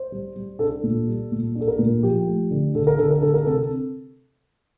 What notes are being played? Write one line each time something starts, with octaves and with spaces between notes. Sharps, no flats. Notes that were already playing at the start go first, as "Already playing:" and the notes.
Already playing: C5
G3
G3
D4 A4
A#2
G3
A#2
D4
A4
A#4
A#2
F3 G4
A3
D3
D3 A4
A#4
D3 A4
A#4
D3 A4
A#4
C3 A4